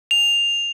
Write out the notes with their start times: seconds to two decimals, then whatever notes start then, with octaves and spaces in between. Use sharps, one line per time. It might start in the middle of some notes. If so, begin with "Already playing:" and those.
0.11 F7